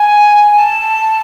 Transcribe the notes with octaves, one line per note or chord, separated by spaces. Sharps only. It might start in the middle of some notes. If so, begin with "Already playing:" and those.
Already playing: G#5
A5